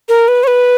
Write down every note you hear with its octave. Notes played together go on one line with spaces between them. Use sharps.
A#4
B4
C#5
B4